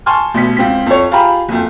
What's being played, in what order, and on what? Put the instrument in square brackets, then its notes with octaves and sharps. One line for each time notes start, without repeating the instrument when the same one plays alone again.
[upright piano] G#5 A5 C6 C#6 F6
A1 B2 B6
C#2 C4 B6
F2 C#5
F4 G4 G#4 A#5 B5
F#1 F2